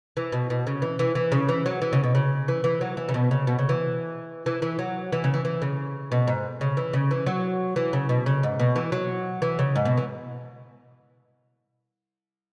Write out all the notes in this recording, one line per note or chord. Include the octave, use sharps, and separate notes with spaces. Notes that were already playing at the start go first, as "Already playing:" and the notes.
E3
B2
B2
C#3
E3
E3
E3
C#3
E3
F#3
E3
C#3
B2
C#3
E3
E3
F#3
E3
C#3
B2
C#3
B2
C#3
E3
E3
E3
F#3
E3
C#3
E3
E3
C#3
B2
G#2
C#3
E3
C#3
E3
F#3
E3
C#3
B2
C#3
G#2
B2
E3
F#3
E3
C#3
G#2
B2
E3